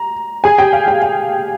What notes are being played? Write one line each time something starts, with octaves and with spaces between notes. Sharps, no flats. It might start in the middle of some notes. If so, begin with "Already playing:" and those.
Already playing: A#5
G#4 G#5
G4 G5
F5
G4 G5
F5